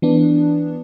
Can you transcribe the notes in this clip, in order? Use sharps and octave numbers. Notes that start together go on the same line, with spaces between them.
E3 B3 D4